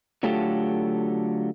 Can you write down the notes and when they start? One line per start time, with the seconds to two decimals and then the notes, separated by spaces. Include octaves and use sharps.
0.23 D3 F#3 A3 F4 G4 A4